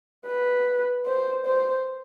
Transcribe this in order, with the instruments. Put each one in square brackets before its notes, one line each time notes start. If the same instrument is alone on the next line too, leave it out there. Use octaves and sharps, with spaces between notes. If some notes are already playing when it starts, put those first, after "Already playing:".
[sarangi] B4
C5
C5